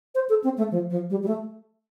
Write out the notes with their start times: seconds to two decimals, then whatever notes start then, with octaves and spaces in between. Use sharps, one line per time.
0.15 C5
0.29 A4
0.44 C4
0.58 A3
0.72 F3
0.90 F3
1.10 G3
1.23 G3
1.28 A3